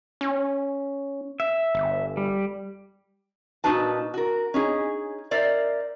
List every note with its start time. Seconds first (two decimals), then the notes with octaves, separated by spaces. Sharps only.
0.21 C#4
1.40 E5
1.75 G1
2.17 G3
3.64 A#2 D#4 F#4 B4 A5
4.14 F#4 A#4
4.54 C#4 D#4 G#4
5.31 A#4 C5 D5 E5